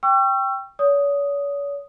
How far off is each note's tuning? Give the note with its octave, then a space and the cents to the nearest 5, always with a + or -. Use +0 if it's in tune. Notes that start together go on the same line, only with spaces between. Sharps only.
G5 +0 C#6 +0 E6 +40
C#5 +40 D#6 +0